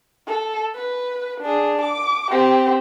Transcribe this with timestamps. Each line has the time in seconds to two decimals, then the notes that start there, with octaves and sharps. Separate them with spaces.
0.27 A4
0.75 B4
1.41 D4 G#4
1.81 D6
2.31 C4 G4